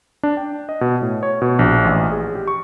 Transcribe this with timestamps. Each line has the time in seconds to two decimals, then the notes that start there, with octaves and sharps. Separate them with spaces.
0.23 D4
0.37 G5
0.69 D#5
0.81 B2
1.02 A2
1.23 C#5
1.42 B2
1.59 A#1
1.85 A1
2.12 G#4
2.35 G4
2.48 C#6